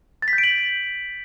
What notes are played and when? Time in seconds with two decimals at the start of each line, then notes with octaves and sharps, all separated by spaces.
0.22 A6
0.28 B6
0.33 G6
0.38 D7
0.44 F#7